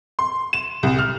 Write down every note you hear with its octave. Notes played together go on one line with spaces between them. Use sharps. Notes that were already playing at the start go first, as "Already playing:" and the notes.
C6
E7
C2
F6